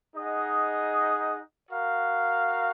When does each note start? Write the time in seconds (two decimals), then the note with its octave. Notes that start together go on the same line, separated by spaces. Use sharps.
0.15 D#4 G#4 D#5 F#5
1.69 F#4 A#4 F5